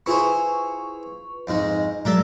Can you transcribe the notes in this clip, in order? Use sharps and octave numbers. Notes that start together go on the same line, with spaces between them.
E4 F4 G#4 B4 C5 C#6
F2 G#2 G#3
A2 F#3 G#3 A#4 D5 E5